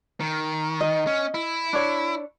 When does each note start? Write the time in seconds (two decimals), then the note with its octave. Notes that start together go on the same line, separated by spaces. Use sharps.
0.20 D#3
0.81 D#5
1.07 C#4
1.34 E4
1.73 D4 C#5